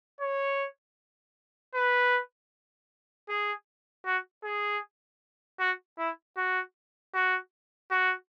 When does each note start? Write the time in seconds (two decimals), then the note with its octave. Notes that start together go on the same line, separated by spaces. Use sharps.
0.21 C#5
1.74 B4
3.29 G#4
4.06 F#4
4.44 G#4
5.60 F#4
5.98 E4
6.37 F#4
7.14 F#4
7.91 F#4